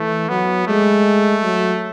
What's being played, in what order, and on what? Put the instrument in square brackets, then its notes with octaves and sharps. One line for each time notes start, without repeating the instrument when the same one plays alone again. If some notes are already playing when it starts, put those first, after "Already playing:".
Already playing: [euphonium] E3 [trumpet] A3
[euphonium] F#3 [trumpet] B3
[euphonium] G#3 [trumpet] A3
[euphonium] F#3